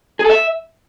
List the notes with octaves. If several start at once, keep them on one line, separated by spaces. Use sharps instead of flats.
G#4
A4
E5